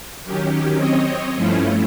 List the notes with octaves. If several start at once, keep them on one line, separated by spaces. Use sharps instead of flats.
D#3 F#3 C#4 G4
C4 C#5 D#5
G2 F3 A3 C#4 E4 F4